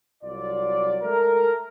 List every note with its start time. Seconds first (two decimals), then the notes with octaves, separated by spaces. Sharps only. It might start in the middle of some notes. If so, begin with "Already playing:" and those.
0.23 C2 F#3 F4 D5
1.02 G#3 A3 A4 A#4